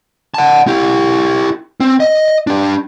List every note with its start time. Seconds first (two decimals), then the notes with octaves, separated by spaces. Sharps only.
0.34 F#5 A5
0.67 E4 G4
1.80 C4
2.00 D#5
2.47 D4 G4